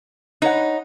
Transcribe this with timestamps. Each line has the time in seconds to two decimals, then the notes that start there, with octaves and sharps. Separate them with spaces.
0.42 D#4 B4 C#5 F#5